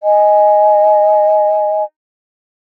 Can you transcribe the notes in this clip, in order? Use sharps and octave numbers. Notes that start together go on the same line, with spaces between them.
D#5 G#5